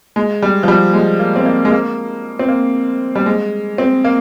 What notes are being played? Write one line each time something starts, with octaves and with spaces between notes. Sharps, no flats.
G#3
G3
F3
G3
G#3
A#3
C4
A#3
G#3
A#3
C4
A#3
G3
G#3
C4
A#3